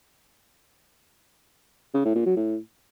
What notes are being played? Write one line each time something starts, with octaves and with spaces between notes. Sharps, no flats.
C#3
A2
A#2
F#3
A2